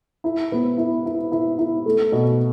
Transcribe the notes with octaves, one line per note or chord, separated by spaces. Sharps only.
E4
B3
E4
E4
E4
E4
A3
B2